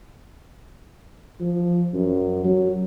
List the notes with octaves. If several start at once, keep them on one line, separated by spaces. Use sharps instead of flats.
F3
F#2
F#3